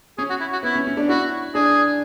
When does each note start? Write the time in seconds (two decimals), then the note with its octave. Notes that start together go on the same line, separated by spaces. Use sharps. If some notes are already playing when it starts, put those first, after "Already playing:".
0.18 C#4 G#4
0.30 F#4
0.40 E4
0.52 F#4
0.63 B3 E4
0.75 C#4
0.87 C#4
0.97 D4
1.09 E4 F#4
1.54 D4 G#4